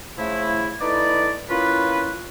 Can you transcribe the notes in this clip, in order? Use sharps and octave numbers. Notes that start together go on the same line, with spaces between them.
C#3 F3 A3 E4
A3 D#4 E4 B4 D5
A#3 C#4 E4 F4 B4